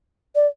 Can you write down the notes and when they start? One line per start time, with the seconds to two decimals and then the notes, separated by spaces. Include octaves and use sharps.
0.35 D5